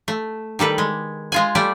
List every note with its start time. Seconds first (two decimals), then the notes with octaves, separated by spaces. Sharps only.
0.08 A3
0.59 D#3 G3 A4 B4
0.78 G#3
1.32 G#3 F4 G#5
1.55 G3 A3 D5